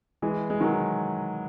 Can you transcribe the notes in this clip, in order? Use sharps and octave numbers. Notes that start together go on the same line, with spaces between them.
E3 G#3
G#3
D#3 F#3